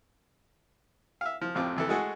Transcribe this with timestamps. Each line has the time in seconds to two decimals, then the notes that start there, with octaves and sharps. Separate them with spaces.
1.21 E5 F5
1.41 F3
1.55 A1 F2 C4 F4 D6
1.76 F2 E3 A4
1.89 G#3 A3 F#4 G#4 A4